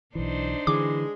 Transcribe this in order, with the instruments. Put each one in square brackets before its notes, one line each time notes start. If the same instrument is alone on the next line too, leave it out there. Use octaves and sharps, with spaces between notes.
[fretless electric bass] B1 E3 [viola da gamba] D4 D#4 C5
[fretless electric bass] D3 E3 [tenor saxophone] G#3 [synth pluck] D6